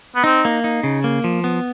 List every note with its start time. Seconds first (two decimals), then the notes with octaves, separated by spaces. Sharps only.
0.16 B3
0.24 C4 D#4
0.45 A#3
0.64 D#4
0.83 C#3
1.04 A#3
1.24 F3
1.44 B3